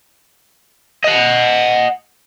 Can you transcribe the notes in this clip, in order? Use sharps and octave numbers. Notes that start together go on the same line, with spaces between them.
D#5 F#5